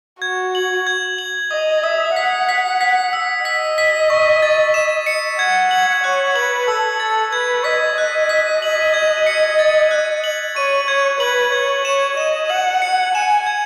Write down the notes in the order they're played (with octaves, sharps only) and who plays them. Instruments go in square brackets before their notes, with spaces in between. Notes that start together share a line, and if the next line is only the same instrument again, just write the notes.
[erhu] F#4 [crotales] G#6
[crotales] F#7
G#6
F#7
[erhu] D#5 [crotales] D#6
[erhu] E5 [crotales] D#6
[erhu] F#5 [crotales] B6
[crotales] B6
B6
E6
[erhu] D#5 [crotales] B6
[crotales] B6
C#6
A6
E7
C#7
[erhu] F#5 [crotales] G#6
[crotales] F#7
[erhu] C#5 [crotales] F#6
[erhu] B4 [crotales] F#7
[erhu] A4 [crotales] E6
[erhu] A4 [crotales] A6
[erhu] B4 [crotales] G#6
[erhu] D#5 [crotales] B6
[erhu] D#5 [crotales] F#6
[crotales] B6
F#7
G#6
C#7
A6
F#6
F#7
[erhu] C#5 [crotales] D#7
[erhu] C#5 [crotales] G#6
[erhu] B4 [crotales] F#7
[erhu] C#5 [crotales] G#6
[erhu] C#5 [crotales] E7
[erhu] D#5 [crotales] E7
[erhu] F#5 [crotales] F#7
[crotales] C#7
[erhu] G#5 [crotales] E7
[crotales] G#6